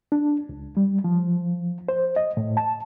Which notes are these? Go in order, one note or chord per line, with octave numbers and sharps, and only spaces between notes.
D4
C#2
G3
F3
C5
D#5
A2
A5